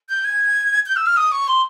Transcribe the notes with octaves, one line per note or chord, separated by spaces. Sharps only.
G6
G#6
G6
E6
F6
D#6
C#6
C6